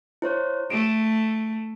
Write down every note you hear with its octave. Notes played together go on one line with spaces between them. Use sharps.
E4 C5 C#5
A3 D7